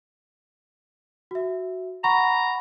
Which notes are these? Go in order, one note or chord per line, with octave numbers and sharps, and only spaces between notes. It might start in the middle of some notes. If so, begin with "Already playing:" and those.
F#4 E5
F#5 A#5 B5 C#6